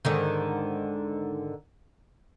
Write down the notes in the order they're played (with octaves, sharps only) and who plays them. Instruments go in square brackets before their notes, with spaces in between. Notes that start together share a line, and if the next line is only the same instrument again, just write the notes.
[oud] G#2 D3 D#3